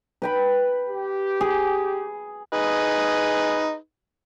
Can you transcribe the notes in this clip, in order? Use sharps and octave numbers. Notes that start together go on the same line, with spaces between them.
B4 G5 B5
G4
G#4
D#4 G#4 B4